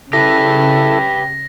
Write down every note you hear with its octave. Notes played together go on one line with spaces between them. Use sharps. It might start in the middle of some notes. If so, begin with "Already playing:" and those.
C#3 E4 G4 A4 B4 A#6